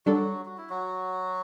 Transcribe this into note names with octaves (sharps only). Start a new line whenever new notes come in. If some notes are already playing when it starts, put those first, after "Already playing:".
F#3 G3 D4 F#4 A4
F#4
E4
F#3 F#4